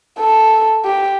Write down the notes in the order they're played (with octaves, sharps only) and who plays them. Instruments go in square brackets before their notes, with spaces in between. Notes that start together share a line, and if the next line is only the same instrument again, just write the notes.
[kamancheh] A4
G4